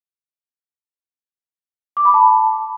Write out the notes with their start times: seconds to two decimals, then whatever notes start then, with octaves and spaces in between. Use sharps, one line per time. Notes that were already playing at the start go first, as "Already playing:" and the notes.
1.97 D6
2.05 B5
2.14 A5